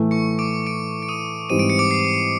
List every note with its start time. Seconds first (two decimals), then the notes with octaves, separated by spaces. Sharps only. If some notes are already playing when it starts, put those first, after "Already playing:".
Already playing: A2 E3 A3
0.11 C#6 C#7
0.39 D6 D7
0.67 D6 D7
1.03 D7
1.08 D#6 D#7
1.50 G#2 E3 G3 C4 D#7
1.59 D7
1.70 C#7
1.79 D6 D7
1.91 C7